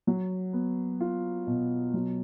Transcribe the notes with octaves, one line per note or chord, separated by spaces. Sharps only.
F#3
B3
F4
B2
F#3